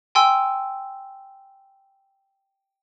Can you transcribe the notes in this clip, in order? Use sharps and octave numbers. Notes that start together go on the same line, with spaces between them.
G5 G#5 C6 E6